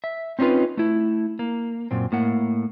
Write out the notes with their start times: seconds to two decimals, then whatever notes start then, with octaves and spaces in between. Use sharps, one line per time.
0.04 E5
0.39 C4 C#4 D#4 F4 B4
0.77 A3 E4
1.39 A#3
1.91 F#2 A#2 C4
2.12 A2 A#3 F#5